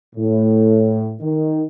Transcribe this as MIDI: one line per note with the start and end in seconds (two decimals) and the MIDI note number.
0.16 1.15 45
1.21 1.65 51